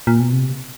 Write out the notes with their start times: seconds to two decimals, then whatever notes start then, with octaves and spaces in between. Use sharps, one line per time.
0.07 A#2
0.20 B2
0.33 C3